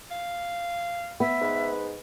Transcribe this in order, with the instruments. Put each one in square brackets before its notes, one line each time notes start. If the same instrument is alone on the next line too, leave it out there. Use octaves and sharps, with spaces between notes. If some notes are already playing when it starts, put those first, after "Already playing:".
[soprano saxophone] F5
[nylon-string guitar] B3 [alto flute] E5
[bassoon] G#2 [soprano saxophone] B4